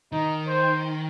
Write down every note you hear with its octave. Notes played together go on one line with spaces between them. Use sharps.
D#3 D#4
C5